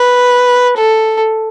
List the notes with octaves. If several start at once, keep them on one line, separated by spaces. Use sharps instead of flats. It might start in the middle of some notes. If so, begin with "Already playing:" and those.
Already playing: B4
A4